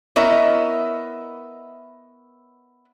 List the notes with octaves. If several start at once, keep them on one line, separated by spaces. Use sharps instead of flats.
B3 E4 A#4 C#5 D#5 E5